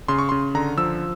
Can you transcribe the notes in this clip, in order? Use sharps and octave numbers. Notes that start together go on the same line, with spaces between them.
C#3 C6
C#6
C#3 C6
D3 A#5
F3 E6